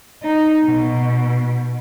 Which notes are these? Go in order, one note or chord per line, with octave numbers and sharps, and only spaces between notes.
D#4
B2